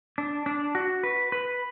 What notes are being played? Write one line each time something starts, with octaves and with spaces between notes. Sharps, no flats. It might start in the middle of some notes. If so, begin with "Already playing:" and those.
D4
D4
F#4
B4
B4